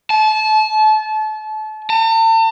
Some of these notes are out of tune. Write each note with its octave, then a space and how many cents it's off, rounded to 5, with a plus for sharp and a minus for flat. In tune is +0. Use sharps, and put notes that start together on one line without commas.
A5 -30
A5 +40